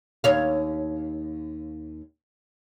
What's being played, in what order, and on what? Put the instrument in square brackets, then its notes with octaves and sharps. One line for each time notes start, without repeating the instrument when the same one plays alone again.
[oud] D#2 C#5 F5